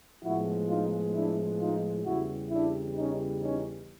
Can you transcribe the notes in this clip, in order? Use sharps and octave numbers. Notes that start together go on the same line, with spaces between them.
A2 F3 G#3 B3 E4 F#4
D#4 F4
D4 E4
D#4 F4
E2 C#3 E3 G3 E4 F#4
D4 E4
C#4 D#4
C#4 D#4